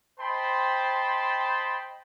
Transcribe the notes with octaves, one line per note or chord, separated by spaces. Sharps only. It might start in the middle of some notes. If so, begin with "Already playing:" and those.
C5 D#5 G5 A5 B5 C6